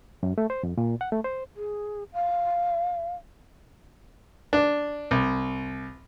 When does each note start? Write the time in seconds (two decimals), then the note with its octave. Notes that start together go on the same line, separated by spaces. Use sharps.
0.23 F#2
0.38 A3
0.50 C5
0.63 F2
0.78 A#2
1.01 F#5
1.12 A3
1.24 C5
1.55 G#4
2.13 F5
4.53 D4
5.11 C2